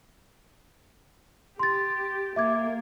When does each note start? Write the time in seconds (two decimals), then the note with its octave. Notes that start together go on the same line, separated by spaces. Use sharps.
1.59 G4 C6 A6
2.36 A#3 E5 D6 G#6